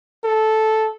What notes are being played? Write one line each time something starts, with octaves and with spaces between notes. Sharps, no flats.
A4